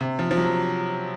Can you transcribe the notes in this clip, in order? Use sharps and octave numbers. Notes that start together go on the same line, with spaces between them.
C3
F3
F3
F#3